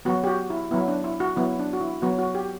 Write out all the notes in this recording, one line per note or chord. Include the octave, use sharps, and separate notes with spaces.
F#3 B3 F#4
G4
F#4
E4
F#3 B3 E4
D4
E4
F#4
F#3 B3 E4
D4
F#4
E4
F#3 B3 F#4
F#4
G4